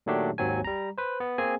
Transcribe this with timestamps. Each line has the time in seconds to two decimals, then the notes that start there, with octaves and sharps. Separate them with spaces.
0.06 A#2 D#3 F#3 A3 D4 G4
0.38 G#1 D#2 F#3 C4 G#5
0.64 G3 A#5
0.98 B4 C5
1.20 B3
1.38 A#3 C4 G#4 G#5